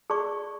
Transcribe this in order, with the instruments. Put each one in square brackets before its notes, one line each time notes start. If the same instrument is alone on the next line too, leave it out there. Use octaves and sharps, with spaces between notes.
[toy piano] G#4 D5 A5 C#6